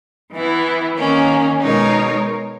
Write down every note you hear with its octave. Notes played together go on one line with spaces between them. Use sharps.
E3 B3 E4
D#3 A#3 C#4
B2 G#3 D#4 A#4 C#5